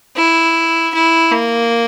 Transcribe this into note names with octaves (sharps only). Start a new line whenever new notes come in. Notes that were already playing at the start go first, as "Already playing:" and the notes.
E4
E4
A#3